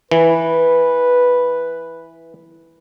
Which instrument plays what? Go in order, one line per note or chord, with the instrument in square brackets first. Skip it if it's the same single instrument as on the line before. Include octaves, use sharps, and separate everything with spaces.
[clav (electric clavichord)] E3 [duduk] B4